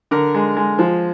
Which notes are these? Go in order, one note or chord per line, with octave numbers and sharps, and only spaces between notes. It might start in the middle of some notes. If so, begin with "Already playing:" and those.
D3 A#4
G#3
G#3
F3